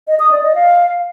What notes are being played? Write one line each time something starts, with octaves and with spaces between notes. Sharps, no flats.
D#5
D#6
D5
D#5
F5